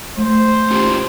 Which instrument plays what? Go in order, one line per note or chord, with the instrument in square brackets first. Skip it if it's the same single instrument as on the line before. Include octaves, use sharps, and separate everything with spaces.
[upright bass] A3 [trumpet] C5
[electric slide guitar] C#4 F4 G4